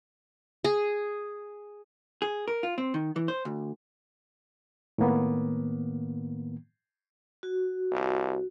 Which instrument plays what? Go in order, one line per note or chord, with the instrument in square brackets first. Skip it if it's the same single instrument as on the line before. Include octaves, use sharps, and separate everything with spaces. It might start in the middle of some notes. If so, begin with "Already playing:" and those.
[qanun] G#4
[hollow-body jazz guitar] G#4
A#4
F4
C4
D#3
E3
C5
D2
[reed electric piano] A2 D#3 A#3 B3
[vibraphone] F#4
[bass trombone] C2